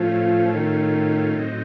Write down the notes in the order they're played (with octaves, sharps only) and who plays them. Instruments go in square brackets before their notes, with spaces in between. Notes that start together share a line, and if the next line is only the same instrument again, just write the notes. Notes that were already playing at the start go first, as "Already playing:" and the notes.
Already playing: [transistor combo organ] A2 A3 C#4 F4 [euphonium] F3
[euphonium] D#3
[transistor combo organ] A2 F#3 C4 D#4